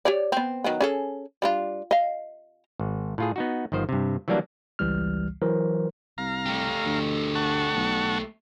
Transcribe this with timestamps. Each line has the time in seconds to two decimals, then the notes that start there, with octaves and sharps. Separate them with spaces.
0.05 G4 C#5 D5
0.32 B3 C4
0.64 D#3 F#3 B3
0.81 C#4 G#4 A4
1.42 G3 D4 F4
1.91 D#5 F5
2.79 G#1
3.18 A2 F4 G#4
3.36 B3 D#4 F#4
3.72 G1 D#3 F3 C5
3.89 G2 C3
4.28 E3 F#3 G3 A#3 D4
4.79 G#1 C#2 E3 G3 F6
5.42 E3 F#3 A#4 C5
6.18 C2 F5 A#5
6.46 A3 G4
6.86 D2
7.35 F#5 A5 C#6
7.76 B1